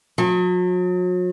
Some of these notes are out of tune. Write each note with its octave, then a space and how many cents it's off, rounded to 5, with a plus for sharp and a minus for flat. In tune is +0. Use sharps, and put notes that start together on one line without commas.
F#3 -40